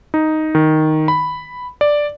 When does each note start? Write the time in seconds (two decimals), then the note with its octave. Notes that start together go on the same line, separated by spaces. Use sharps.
0.14 D#4
0.55 D#3
1.08 B5
1.81 D5